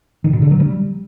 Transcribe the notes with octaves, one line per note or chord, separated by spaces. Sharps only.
D#3
B2
D3
F#3
G3